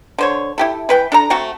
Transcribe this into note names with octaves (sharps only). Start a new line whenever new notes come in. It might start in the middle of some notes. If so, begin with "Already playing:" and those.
D3 C5 C#5
E4 G4 A4
E3 B4 G5
D4 A4 A#5
A3 C4 F#4